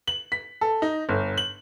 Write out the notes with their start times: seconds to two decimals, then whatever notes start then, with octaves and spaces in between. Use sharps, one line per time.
0.07 F#7
0.32 B6
0.61 A4
0.82 D#4
1.09 G1
1.38 F#7